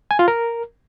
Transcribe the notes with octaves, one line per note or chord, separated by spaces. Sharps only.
G#5
F4
A#4